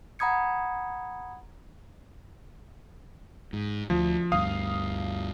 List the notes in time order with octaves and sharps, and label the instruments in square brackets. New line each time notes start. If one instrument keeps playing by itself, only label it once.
[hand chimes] F#5 A#5 B5 D#6 G#6 C#7
[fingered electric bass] G#2
[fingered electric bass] D2 [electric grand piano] F3
[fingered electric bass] D2 G2 [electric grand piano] F5 D#6